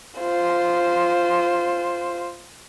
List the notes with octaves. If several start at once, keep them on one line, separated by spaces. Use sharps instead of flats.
F4 C5